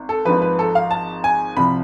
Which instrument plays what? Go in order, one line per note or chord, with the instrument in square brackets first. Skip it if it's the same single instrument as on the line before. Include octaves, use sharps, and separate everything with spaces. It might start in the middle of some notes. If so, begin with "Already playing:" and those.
Already playing: [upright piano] G#1
A4
G#1 G#2 F3 B4
B4
A4
F5
A5
G#5
C2 C3 F3 B5